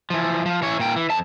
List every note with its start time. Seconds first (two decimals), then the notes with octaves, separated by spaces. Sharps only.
0.10 E3 F3
0.46 F3
0.62 E3 C#5
0.80 A#2 G5
0.96 E3
1.10 F2 A5